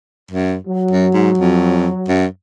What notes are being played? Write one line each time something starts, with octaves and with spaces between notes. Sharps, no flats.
F#2
F#3
F#2
G#2
F2
F#2